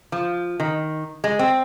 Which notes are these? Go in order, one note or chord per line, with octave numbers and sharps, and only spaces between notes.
F3
D#3
G#3
C4